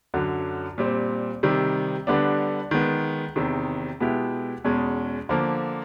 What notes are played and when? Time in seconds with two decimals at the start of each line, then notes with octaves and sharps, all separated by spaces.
0.14 F#2 D3 F#3
0.78 A#2 G3 C4
1.43 C3 D#3 G3
2.07 D3 G3 B3 D4
2.71 D#3 G#3 B3
3.36 E2 C3 D#3
4.00 B2 G#3 B3 E4 G4
4.64 E2 B2 G#3 C#4
5.29 D3 F3 A#3